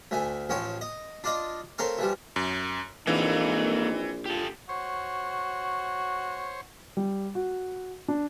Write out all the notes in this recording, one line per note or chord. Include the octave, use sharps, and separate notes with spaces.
D2 A3 G#5
A1 F3 C#5 G5
D#5
D4 F4 D5 D#5
A3 C4 A#4 C#5 F5
E3 F3 G3
F#2
A#1 E3 A#3 C4 D#4 A4 F5
F4 G4 A4
F#4 C5 C#5
G3
F#4
D4